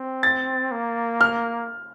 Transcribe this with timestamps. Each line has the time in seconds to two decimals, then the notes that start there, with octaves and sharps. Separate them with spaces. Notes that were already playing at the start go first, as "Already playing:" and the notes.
Already playing: C4
0.23 A6
0.71 A#3
1.21 F6